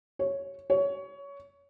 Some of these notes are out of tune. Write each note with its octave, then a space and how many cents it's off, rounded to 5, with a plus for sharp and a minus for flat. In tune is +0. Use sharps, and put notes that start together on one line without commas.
C#5 +0
C#5 +20